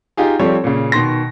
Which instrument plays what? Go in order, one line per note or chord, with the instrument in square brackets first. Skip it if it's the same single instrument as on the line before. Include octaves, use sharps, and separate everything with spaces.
[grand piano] D#4 F4 G4 G#4
F3 G3 C4 G4 A4 C#5
A#2 C#3
B2 D#3 C6 A#6